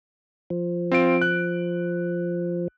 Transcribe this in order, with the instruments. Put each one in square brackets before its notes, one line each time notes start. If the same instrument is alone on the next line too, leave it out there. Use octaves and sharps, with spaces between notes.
[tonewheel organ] F3
[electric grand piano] C4 F4 D7
F#6